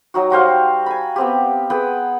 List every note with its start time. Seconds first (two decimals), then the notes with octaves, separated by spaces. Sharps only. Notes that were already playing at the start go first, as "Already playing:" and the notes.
0.14 F#3 D#4 F#4
0.30 G3 F#4 C5 F5
0.86 G#5 B5
1.16 B3 C4 G4
1.70 G#4 B4 F#5 G5